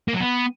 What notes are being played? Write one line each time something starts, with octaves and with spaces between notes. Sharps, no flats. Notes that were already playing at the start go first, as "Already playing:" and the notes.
A#3
F#3
B3